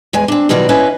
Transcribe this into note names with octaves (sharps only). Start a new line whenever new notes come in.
E2 G#3 G#5
C4 D4
B2 D#3 F#3 G3 F4 F#4
C#4 E4 B4 C#5 D#5 F5